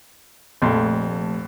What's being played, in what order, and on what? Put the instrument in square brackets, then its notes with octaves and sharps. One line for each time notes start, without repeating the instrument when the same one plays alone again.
[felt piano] F1 A3 [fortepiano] A#1 F2 C6